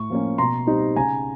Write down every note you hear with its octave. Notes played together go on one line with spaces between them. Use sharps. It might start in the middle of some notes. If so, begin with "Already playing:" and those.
Already playing: A2 C#6
F3 A#3 C#4
B2 A#5 C6
G3 C4 D#4
C#3 G#5 A#5